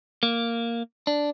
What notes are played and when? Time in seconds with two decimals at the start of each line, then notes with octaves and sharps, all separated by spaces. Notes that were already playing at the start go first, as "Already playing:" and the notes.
0.23 A#3
1.07 D4